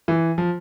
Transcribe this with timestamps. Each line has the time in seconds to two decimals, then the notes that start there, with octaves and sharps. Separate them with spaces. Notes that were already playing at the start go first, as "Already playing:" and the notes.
0.08 E3
0.38 F3